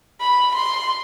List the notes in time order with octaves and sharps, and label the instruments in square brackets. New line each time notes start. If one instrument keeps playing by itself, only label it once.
[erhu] B5
C6